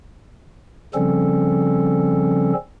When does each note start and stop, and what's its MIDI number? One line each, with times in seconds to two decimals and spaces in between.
0.94 2.53 49
0.94 2.53 53
0.94 2.53 55
0.94 2.53 60
0.94 2.53 61
0.94 2.53 69